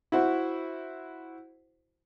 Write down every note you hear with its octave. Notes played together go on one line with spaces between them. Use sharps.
E4 F#4 C5